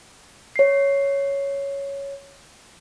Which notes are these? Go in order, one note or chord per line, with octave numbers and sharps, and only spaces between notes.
C#5 C7